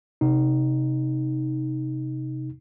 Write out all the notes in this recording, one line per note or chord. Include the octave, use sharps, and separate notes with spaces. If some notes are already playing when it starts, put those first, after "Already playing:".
C3 D#4